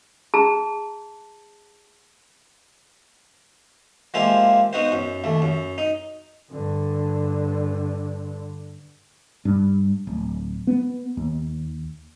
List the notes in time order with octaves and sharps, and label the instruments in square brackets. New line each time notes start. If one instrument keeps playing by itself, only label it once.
[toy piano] G#4 A5 A#5
[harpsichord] F3 G#3 A#3 E4 F4 G4
B3 D#4 F#4 C5
F#2
D#2 A3
F#2
D#4
[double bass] G2 D3
[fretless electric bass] G2
D1
B3
D#2